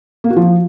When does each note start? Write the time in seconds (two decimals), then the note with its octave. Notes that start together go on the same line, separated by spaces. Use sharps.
0.24 A#3
0.30 F#4
0.36 F3